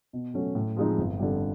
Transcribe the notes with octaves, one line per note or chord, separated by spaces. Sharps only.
B2
F#3 A3 C#4
A2
F3 G#3 C4 D#4
G1
F2 D3 G3